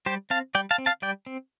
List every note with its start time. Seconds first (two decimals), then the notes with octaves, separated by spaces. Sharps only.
0.06 G3 G4 C5
0.30 C4 F5 A5
0.55 G3 D5 G5
0.71 F5 A5
0.78 C4
0.86 F5 A5
1.02 G3 D5 G5
1.26 C4